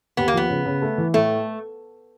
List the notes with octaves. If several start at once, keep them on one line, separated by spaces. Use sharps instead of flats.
D#2 B3
A#3
F3 B3
C#3
C#3
A3
E3
A2 A3